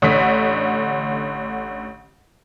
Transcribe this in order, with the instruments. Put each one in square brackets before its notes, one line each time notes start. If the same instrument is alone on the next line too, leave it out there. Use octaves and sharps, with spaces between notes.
[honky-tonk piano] A1 D3 B6